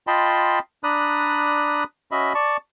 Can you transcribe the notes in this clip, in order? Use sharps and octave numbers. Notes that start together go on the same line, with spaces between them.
F4 D#5 G5 A5 B5 C6
D4 D5 A#5 B5 D#6 F#6
C#4 F#4 D#5 E5 B5
D5 A5 C#6